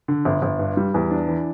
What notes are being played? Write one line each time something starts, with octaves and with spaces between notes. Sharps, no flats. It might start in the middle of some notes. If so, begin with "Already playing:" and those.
D3
G1
G1
G2
G3
E2
D4
E3